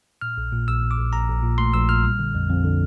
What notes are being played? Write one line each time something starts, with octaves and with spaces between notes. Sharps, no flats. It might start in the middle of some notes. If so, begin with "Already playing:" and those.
A#2 F6
A#1
A#2
A#1 E6
A#1
D6
A#1
A#1 A#5
A#1
A#2
A3 C6
A#1 E6
A#2 F6
G3
D3
F2
F2
D3